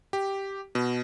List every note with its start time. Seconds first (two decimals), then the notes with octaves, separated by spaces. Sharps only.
0.13 G4
0.75 B2